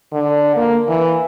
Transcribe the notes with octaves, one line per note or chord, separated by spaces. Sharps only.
D3
A#3
E3